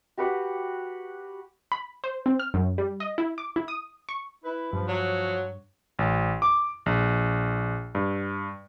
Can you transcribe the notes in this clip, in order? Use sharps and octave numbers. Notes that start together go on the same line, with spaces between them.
F#4 G4 B4 F#5
B5
C5
C4
F6
F#2
G3
D#5
E4
D6
E4
D#6
C#6
E4 B4
G2 F3
F#3 C#5
A1
D6
A#1
G2